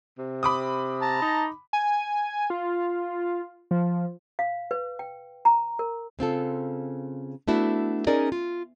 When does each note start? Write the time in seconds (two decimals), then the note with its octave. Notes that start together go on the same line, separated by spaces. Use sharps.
0.18 C3
0.43 B5 D6 D#6
1.02 A5 A#5
1.22 D#4
1.73 G#5
2.50 F4
3.71 F3
4.39 F5
4.71 B4
4.99 G5
5.45 A#5
5.79 A#4
6.19 C#3 C4 F4 A4
7.48 A3 B3 D4 E4 F#4
8.07 C#4 D#4 G#4 A#4 D5 D#5
8.32 F4